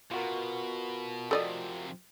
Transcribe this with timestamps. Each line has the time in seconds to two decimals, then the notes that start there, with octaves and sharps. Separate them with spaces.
0.11 B2 F4 F#4 A#4
1.31 F2 C3 A4 D5 D#5